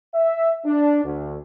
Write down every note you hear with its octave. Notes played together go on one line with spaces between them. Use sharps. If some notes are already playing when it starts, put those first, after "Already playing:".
E5
D4
D2